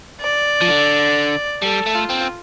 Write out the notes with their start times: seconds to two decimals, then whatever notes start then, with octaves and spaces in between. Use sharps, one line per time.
0.21 D5
0.61 F3
0.68 D3
1.62 G3 A4
1.87 A3
1.95 F4
2.10 C4